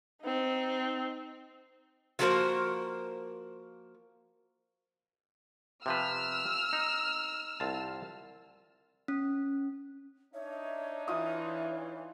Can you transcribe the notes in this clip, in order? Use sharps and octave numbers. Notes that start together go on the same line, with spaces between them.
C4 D#4
F3 F#3 A#3 F#4 A#4 C5
C3 F3 B4 E6 F6
D#4
C2 F4 A5
C#4
D4 D#4 C#5 E5
E3 F4 C#5 D#6